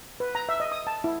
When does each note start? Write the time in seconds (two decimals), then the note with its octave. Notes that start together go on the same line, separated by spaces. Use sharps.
0.20 B4
0.35 A#5
0.49 E5
0.60 D#5
0.72 D#6
0.87 A5
1.04 E4